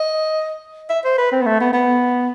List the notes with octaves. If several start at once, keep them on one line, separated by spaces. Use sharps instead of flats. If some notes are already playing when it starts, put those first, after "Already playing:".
Already playing: D#5
E5
C5
B4
C4
B3
A3
B3
B3